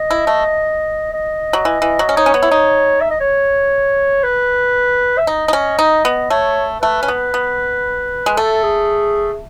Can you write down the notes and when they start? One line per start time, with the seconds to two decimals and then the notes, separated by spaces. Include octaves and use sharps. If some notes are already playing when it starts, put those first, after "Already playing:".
Already playing: D#5
0.11 E4
0.27 A3
1.13 D#5
1.53 F#3
1.65 E3
1.82 E3
1.99 F#3
2.09 C#4
2.16 D#4 C#5
2.26 C#4
2.34 B3
2.43 E4
2.51 D#4
3.01 E5
3.11 D#5
3.20 C#5
4.24 B4
5.18 E5
5.27 D#4 D#5
5.48 D#4
5.53 C#4
5.79 D#4
6.05 B3
6.30 A3 C#5
6.82 A3 B4
7.03 C#4
7.08 B3
7.34 B3
8.26 G#3
8.37 A3 A4
8.63 G#4